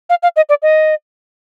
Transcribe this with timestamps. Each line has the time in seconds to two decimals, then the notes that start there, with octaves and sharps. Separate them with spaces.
0.10 F5
0.23 F5
0.36 D#5
0.49 D5
0.62 D#5